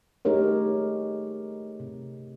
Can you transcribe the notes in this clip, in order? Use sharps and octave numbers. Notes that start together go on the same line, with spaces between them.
A3 D#4 G4 G#4 A#4 C#5
C3